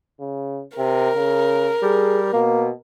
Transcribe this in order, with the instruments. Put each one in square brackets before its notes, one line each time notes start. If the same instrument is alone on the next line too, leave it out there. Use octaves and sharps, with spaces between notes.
[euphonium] C#3
[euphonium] C3 [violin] A#4
[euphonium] C#3
[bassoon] G3 [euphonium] G#4
[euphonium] B2 [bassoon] A#3